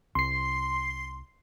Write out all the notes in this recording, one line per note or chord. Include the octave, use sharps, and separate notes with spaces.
C2 C6 C7